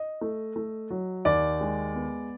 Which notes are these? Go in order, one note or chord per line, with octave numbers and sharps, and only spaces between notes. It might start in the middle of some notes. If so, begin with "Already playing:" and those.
Already playing: D#5
A3
A3
F#3
D#2 D5
G#3
B3